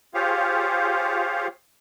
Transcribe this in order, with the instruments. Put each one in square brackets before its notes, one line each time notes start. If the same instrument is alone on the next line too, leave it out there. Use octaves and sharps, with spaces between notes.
[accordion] F4 G4 G#4 C5 C#5 F5